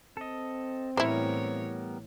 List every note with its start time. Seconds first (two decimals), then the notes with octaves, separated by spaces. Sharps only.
0.17 C4 A4 D#5
0.97 A2 E3 G3 B3 E4 A#4 C5 C#5